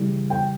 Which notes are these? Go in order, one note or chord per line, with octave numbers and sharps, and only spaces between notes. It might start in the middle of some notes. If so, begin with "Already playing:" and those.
Already playing: C#3 E3 G3
G5